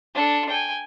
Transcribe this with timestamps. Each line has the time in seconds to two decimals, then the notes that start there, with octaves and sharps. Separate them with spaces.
0.14 D4 A4
0.49 G5 G#5